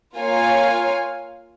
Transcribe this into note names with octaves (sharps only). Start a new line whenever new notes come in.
A#3 F4 C#5 F5 G#5